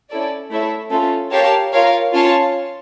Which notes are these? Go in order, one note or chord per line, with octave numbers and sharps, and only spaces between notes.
C#4 E4 A4 D5
A3 E4 A4 C#5 E5
A3 C#4 F4 A4
G4 A#4 C#5 F5 A5
F4 A#4 C#5 F5
C#4 F4 C#5 F5 A5